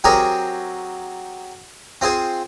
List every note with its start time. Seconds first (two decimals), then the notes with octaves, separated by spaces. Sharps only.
0.04 F#3 C4 G4 G#4 A#4 C#5
2.01 C4 F4 G#4 C5